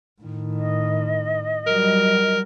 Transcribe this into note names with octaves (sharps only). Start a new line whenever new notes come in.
A2 D#3
D#5
F#3 G3 A#4